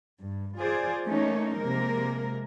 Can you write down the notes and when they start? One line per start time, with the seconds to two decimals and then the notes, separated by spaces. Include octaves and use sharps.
0.21 G2
0.59 F4 G#4 C5 D5
1.05 E3 A3 A#3 C#4 D#4 C#5
1.56 C3 F3 G#3 A#3 A#4